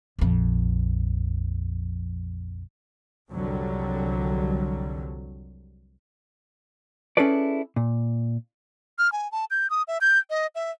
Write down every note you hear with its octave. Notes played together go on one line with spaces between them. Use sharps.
A#1 F2
C2 F2 D3 F#3 G3
C#4 E4 G#4 A4 B4 D5
A#2
F6
G#5
A5
G6
D#6
E5
G6
D#5
E5